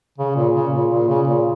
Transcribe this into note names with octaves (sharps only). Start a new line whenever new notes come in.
C#3
A#2
C#3
A#2
A#2
C#3
A#2